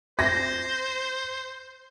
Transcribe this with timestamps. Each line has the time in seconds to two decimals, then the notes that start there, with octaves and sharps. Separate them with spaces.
0.19 C5 A#6